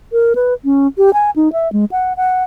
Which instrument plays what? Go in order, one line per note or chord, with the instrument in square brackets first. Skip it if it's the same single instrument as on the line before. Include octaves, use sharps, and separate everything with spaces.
[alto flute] A#4
B4
C#4
G4
G#5
D#4
E5
G#3
F#5
F#5